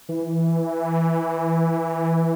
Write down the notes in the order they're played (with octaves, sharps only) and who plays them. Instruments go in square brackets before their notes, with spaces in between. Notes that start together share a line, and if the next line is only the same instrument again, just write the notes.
[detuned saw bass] E3